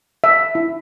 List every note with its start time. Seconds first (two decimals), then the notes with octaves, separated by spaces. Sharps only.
0.24 E5
0.55 E4